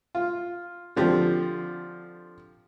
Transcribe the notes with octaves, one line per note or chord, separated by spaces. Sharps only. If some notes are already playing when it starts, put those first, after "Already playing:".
F4
D3 F3 C4 G4